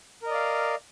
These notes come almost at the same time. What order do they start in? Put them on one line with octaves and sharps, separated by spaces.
A#4 D#5 D5 F5